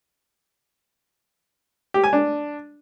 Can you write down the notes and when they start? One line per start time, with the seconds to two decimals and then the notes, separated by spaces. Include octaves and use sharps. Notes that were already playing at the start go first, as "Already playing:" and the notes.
1.94 G4
2.04 G#5
2.13 D4